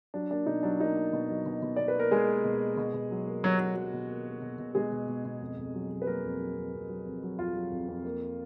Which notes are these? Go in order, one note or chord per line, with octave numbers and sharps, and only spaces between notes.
F#3 D4
A#3 D4
B2 D#4
F#3 D4
A#3 D#4
A#3
B2
F#3
B2
B2
B2 D5
B4
A#3 A#4
B2 G#3 G#4
A#3
B2
A#3
B2
B2
F#3
A#3
B2 F#3 F#4
F#3
F#3
B2
A#3
A#3
B2
B2
B2 G#3 G#4
B2
B2
B2
F2
F2
F#3
F#3
B4
F#3 A#3 A#4
F2
F#3
F2
F2
F#3
F2
F#3
F2 F4 F5
F#3
F2
F2
A#3